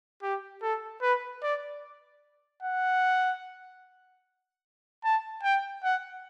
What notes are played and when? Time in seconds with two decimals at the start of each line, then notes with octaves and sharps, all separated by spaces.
0.23 G4
0.62 A4
1.02 B4
1.43 D5
2.63 F#5
5.04 A5
5.43 G5
5.84 F#5